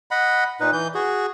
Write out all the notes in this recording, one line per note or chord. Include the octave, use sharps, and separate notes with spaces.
D#5 F#5 B5
A#2 D#4 B4
E3 G6
F#4 G#4